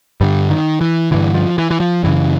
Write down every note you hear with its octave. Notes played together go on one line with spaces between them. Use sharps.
G2 D3 G3
D#3
E3
G2 D3 E3
F3
E3
E3
F3
F#2 C#3 E3